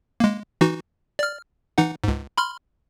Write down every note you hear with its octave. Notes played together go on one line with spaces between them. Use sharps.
G#3 A#3
E3 D#4 F#4
D5 F6
E3 D#4 F#5
C#2 G#2
B5 C6 F6